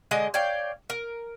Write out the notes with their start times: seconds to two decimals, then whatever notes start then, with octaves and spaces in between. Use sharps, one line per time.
0.11 D3 G#3 D#5
0.34 C#5 D5 F5 G5
0.90 A#4